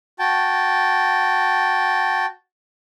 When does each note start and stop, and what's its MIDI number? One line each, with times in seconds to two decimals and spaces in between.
0.19 2.26 66
0.19 2.26 79
0.19 2.26 81